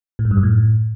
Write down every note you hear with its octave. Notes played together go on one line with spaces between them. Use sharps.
A2
G#2
G2
F#2
A2